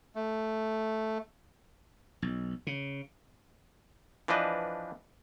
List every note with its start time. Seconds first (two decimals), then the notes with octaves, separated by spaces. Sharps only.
0.15 A3
2.22 B1
2.67 C#3
4.28 E3 F3 D4 B4 D#5